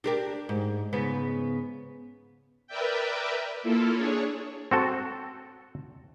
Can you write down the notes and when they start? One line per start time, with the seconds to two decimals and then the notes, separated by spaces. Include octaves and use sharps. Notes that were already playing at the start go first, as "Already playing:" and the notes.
0.04 D4 G4 A#4
0.49 G#2
0.93 G#2 C#3 B3
2.67 A#4 B4 D5 E5 G5
3.63 A#3 E4 F4 A4
3.95 D4 G#4 C#5
4.71 C4 F#4 A4